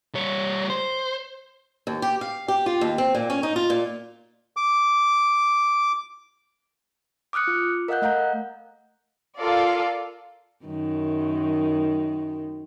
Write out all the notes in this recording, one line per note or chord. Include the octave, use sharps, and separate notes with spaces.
G3 C#5
C5
D#2
G4
F5
G4
F4
D#2
C4
A#2
C#4
D#4
F4
A#2
D6
D6 D#6 F6 F#6 C#7
F4
A#4 D#5 F5 F#5 F#6 G6
A3 D#5 F5 F#5 A#5 G6
F4 A4 A#4 D5 F5
F#2 D#3